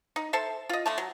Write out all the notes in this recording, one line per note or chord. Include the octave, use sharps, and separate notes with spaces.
D#4
A4 C5 E5 A5
F4 D#5
D3 A3 A5
F#3